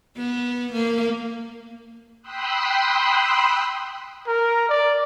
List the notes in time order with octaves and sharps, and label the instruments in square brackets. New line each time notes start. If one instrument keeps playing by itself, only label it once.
[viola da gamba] B3
A#3
[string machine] G5 B5 C6 D#6 E6 F#6
[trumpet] A#4
D5